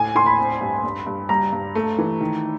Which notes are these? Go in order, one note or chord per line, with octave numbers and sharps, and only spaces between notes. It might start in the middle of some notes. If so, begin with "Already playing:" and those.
Already playing: A2 G#5
A2 C6
B5
C4
G2
G2
G2
G3 A#5
G2
A3
E3
D#3